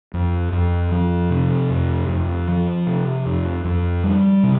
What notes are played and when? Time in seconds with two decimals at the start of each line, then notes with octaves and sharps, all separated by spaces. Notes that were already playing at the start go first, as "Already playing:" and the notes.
0.14 F2
0.52 F2
0.91 F3
1.30 C3
1.70 F2
2.08 F2
2.48 F3
2.87 C3
3.26 F2
3.64 F2
4.04 G3
4.43 C3